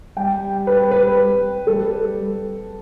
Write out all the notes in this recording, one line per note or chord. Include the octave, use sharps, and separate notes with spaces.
G3 G5
B4
B4
G3 A4